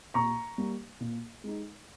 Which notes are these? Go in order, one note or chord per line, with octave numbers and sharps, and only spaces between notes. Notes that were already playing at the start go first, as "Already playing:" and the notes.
A#2 A#5 C#6
G3 A#3
A#2
G#3 D#4